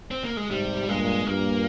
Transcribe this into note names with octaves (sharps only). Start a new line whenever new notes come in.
C4
A#3
G#3
G#2 C3 G3
G2 A#2 G#3
G2 A#2 A#3